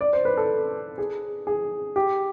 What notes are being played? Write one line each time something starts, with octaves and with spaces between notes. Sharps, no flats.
D5
C5
B4
A4
G#4
G#4
G4